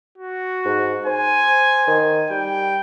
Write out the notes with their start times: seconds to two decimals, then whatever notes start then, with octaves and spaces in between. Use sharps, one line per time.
0.18 F#4
0.65 G#2
1.07 C5 G#5
1.87 D#3
2.30 G3 G5